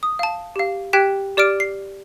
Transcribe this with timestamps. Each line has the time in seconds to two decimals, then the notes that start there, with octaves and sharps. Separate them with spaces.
0.03 D#6
0.19 F5 A5
0.56 G4 F5
0.93 G4 G5 F#6 G#6 B6
1.37 G4 D5 D6 F6 D7
1.60 C7